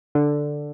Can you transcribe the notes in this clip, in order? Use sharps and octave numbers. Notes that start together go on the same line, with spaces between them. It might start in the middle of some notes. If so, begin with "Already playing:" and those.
D3